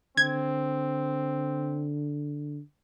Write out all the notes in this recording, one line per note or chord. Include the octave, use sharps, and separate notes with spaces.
D3 C4 G#6